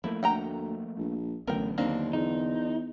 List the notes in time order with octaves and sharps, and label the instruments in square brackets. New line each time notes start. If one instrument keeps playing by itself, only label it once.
[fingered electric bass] F3 A3 A#3 [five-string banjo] E4
[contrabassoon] D2 [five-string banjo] F#5 G5 A#5
[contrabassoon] A#1
[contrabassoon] A1 [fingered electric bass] D3 F#3 B3 [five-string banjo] A#4 G5
[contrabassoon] D#2 [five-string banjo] A#3 C4 D4
[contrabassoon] E2 [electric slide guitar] D#4